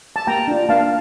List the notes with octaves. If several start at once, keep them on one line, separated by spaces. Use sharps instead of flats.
A5
A#3 G5 A#5
D4 F4
A#3 F5 A5